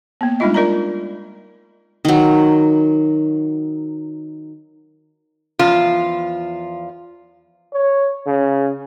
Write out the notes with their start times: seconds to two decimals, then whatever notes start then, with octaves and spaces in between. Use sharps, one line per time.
0.21 A#3 B3
0.40 G3 G#3 D4 D#4 F4 D#5
0.54 F4 A#4 D5 D#5 A#5
2.05 D#3 F#3
5.59 E2 F3 F4
7.73 C#5
8.26 C#3